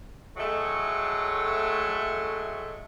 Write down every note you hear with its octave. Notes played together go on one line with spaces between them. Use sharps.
A2 F#3 G#3 A3